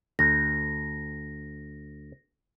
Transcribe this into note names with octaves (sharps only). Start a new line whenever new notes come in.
D2 A#6